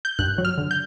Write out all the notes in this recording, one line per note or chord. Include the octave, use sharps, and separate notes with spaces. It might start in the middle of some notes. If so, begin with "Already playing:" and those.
G6
G2 F#6
F#3
F6
D3
G6